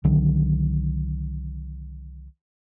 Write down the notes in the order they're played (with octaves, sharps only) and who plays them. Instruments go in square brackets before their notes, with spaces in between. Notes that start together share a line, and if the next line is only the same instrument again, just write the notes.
[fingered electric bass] C2 D3 D#3 F#3